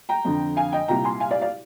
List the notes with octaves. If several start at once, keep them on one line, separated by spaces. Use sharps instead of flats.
G5 A#5
F2 D3
F5 G#5
D#5 G5
C2 A#2 G5 A#5
G#5 C6
F5 G#5
D5 F5
D5 F5